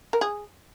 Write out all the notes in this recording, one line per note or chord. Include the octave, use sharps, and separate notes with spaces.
A#4
G#4